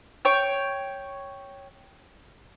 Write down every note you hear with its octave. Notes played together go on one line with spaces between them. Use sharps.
C#5 G5